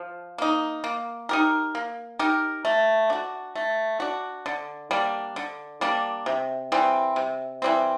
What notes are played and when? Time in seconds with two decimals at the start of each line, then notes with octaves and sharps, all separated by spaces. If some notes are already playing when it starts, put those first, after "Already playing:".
Already playing: F3
0.38 A#3 D#4
0.84 A#3
1.29 D#4 G4 A#4
1.75 A#3
2.19 D#4 G4 A#4
2.65 A3
3.10 D4 F#4
3.55 A3
4.00 D4 F#4
4.46 D3
4.91 G3 A#3 D4
5.36 D3
5.81 G3 A#3 D4
6.26 C3
6.72 E3 G3 C4
7.16 C3
7.62 E3 G3 C4